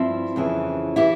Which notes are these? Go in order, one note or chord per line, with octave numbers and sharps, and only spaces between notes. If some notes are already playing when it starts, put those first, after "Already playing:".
Already playing: G2 F3 C4 E4
F2 C#3 E3
E3 E4 G4